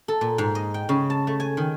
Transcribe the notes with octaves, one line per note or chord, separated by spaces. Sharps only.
A4
A#2
G#2
D#5
G5
C#3
A5
A3
G#5
D#3